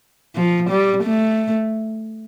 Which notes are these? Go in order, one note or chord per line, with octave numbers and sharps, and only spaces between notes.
F3
G3
A3